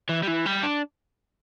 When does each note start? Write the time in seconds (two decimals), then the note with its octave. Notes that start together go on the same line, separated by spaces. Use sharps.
0.09 E3
0.23 G3
0.28 E3
0.46 G3
0.63 D4